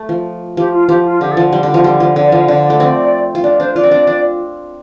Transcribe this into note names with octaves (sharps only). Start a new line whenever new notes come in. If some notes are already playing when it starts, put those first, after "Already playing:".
Already playing: A3
F3
F3 G4
F4
F3 G4
F4
D3 G4
A4
F3
G3
D3
F3
G3
F3
D3 D5
D5
F3
F5
D3 D5
D5
A3
C4
F4
D4 D5
D4 C5
F4 D5
C4
D4
D4